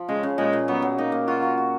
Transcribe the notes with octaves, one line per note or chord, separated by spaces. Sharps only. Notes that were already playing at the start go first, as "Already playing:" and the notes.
Already playing: F3
C#3 G#3
C#3
A#2 G#3
A#2
F#3 B3
F#3
A#3 D#4
A#3
F4 F#4
F#4
F#4